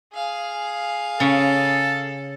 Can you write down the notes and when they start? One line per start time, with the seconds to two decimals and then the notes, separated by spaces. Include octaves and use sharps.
0.13 G#4 F5
1.20 C#3 A4